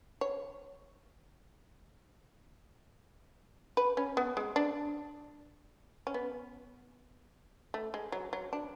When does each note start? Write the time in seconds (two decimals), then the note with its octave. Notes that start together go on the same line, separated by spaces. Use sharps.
0.21 C#5
3.77 B4
3.97 C#4
4.17 B3
4.37 G#3
4.56 D4
6.07 C#4
6.14 B3
7.74 A3
7.94 G#3
8.12 F#3
8.33 F#3
8.53 D4